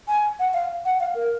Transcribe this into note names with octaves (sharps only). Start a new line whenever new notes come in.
G#5
F#5
F5
F#5
F5
A#4